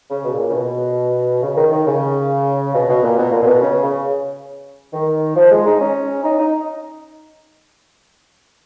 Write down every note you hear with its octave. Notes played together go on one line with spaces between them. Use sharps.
C#3
B2
A#2
C#3
B2
C#3
D#3
D#3
C#3
B2
B2
A#2
B2
A#2
A#2
B2
C#3
C#3
D#3
F3
G#3
D#4
C#4
D#4
D#4